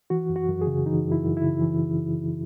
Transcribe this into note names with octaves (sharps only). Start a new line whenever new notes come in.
E3 F#4
F#2
F#4
F#2
G#4
C#3
E3 D#4
F#2
E4
F#2
E4
C#3
E3